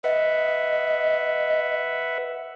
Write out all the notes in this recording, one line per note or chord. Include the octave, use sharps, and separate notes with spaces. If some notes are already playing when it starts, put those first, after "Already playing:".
B4 D#5 E5 F#5